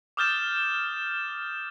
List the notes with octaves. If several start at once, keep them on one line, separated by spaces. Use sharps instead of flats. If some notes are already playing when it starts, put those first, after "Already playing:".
D6 D#6 F6 G6 A6 E7